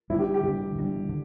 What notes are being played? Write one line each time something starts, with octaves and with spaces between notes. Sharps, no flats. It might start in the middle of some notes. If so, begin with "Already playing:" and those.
D3 G3 D4 E4
G4
G4
D3 G3 D4
D3 G3 D4
D3